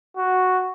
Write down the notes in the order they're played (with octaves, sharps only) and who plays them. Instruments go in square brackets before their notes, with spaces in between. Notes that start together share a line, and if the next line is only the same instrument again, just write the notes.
[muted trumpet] F#4